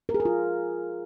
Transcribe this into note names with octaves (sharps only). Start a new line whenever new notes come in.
A#4
G#4
A#4
F4